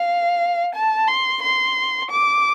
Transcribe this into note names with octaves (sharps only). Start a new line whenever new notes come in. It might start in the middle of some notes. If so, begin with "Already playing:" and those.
Already playing: F5
A5
C6
C6
D6